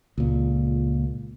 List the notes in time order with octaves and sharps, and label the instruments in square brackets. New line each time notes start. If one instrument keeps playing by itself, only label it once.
[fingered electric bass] C#2 A#2